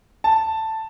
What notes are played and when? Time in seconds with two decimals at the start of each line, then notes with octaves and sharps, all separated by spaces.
0.24 A5